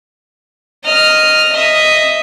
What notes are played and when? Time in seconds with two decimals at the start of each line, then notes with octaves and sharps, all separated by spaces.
0.85 D#5 F6
1.53 D#5 E5